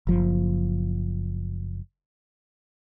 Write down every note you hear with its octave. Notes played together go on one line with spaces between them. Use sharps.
F#1 F3